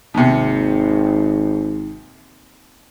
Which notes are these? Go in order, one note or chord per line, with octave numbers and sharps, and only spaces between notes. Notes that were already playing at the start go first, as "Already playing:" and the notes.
G#1 D#2 C3